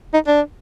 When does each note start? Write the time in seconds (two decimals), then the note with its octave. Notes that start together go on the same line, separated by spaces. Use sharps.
0.14 D#4
0.27 D4